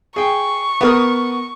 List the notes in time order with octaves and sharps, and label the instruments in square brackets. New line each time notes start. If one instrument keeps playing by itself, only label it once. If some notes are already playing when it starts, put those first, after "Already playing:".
[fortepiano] G#4 G5 [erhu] C#6
[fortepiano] B3 A#4 D#6